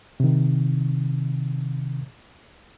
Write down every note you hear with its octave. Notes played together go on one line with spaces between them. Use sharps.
C3 D#3